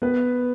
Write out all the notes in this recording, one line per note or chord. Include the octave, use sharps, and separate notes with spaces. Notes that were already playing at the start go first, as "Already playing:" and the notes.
B3 B4